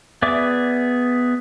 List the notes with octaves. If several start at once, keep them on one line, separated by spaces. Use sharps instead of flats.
B3 G#4 D5 E5 D6